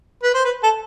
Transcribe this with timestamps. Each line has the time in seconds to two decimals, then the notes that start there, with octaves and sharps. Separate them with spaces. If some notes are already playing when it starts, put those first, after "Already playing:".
0.23 B4
0.34 C5
0.44 B4
0.63 A4